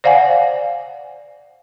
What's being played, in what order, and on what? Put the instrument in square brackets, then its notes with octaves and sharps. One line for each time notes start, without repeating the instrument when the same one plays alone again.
[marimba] C5 D5 F5 F#5 G#5